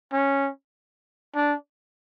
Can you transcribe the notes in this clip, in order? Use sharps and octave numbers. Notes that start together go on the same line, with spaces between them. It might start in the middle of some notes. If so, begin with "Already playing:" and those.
C#4
D4